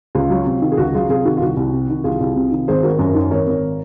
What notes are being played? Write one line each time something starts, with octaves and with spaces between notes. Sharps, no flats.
C#2 F4
F#3
C3
D#3
G#4
C#2 F#4
F#3 F4 G#4
C3 F4 G#4
D#3 F#4
F4
C2 F#4
C2
C3
D#3
C2 F4 G#4
C2
C3
D#3
G#1 G#4 C5
G#1 F#4 A#4
F#2 F#4 A#4
D#3
G#1 A#4 C#5
G#1